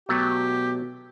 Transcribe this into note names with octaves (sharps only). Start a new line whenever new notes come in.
B2 F#3 A3 G4